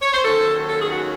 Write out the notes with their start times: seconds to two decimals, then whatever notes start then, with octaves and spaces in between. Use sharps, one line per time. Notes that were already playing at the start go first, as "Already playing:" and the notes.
0.01 C#5
0.13 C5
0.25 D#2 D#3 F#3 C#4 A4
0.69 A4
0.82 G#4
0.92 F#4